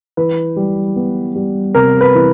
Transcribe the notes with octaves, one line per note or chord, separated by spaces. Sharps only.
E3 B4
G3
B3
G3
C3 A#4
B4
E3